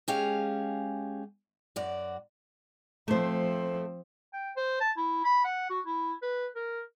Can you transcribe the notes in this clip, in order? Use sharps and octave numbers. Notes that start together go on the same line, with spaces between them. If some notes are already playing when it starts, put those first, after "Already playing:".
G#3 C#4 G4 G#4 F5
F#2 F#4 D5
F3 A3 C4 C5
G5
C5
A5
E4
B5
F#5
F#4
E4
B4
A#4